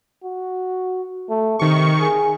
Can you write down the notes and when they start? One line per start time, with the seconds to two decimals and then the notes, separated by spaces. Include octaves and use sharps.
0.24 F#4
1.29 A3
1.59 C3 D#3 C#6
2.00 G#4